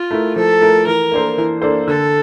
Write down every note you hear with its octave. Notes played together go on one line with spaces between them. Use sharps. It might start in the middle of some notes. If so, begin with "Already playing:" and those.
Already playing: F4
A3 E4 A#4
F3 A4
A3 E4 A#4
E3 A#4
A#3 D4 A4 C5
E3
A#3 D4 A4 C5
D3 A4